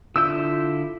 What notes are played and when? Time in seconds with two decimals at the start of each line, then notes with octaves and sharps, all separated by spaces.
0.16 D3 E4 F4 E6 G6